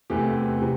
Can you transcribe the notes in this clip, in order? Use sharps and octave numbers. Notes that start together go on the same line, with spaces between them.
E2 C3 E3 A3 G4
C3